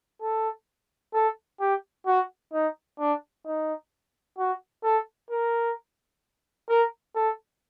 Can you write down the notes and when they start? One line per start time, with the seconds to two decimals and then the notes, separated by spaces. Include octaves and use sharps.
0.21 A4
1.14 A4
1.60 G4
2.06 F#4
2.53 D#4
2.99 D4
3.45 D#4
4.38 F#4
4.84 A4
5.30 A#4
6.69 A#4
7.15 A4